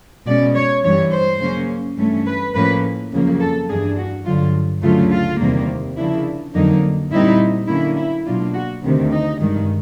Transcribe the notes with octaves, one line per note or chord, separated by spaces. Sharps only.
B2 G#3 C#4 D5
C#5
G2 E3 G3 C#5
C5
C#3 F#3 A#3 C#4
G2 E3 A3 C#4
B4
A2 F3 A#3 C#4 B4
F2 C#3 F#3 A#3
A4
G2 E3 G3 A#3 D4 G#4
F#4
G2 D3 F#3 F4
D2 C#3 F#3 A3 F4
F4
E2 C3 D#3 G3 A#3
C#3 F3 A#3 D4 E4
F2 D3 F#3 A#3 D#4
A#2 G3 C4 D#4 E4
D3 F#3 A#3 C#4 E4
E4
B2 F#3 A#3 D4 F4
F#4
D2 C3 D#3
D#4
G2 D#3 G#3